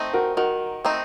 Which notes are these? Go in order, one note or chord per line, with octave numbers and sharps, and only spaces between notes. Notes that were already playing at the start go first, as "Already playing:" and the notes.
Already playing: A3 C4 D#4
F#4 A#4
D#3 F#4 A#4
A3 C4 D#4